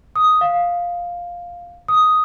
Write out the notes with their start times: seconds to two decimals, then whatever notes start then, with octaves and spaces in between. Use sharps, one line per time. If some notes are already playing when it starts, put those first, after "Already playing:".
0.16 D#6
0.41 F5
1.88 D#6